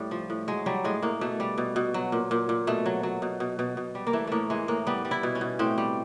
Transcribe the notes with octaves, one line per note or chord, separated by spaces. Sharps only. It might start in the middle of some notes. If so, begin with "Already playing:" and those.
Already playing: A2 G3
F3
A2
F#3 G#3
F#3 G3
A2 G#3
A2 A#3
B2 A3
G3
B2
B2
F#3
A#2
A#2
A#2
B2 A3
F#3
F#3
B2
B2
B2
B2
G3
A#3
E3 A3
A2 A3 A#3
E3 G#3
A2 A#3
G3 B3
G3
E4
B2
C#4
B2
A2 C4
G3